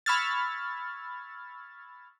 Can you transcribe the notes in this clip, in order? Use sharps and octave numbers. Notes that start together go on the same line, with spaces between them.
B5 C#6 E6 F6 G#6 A6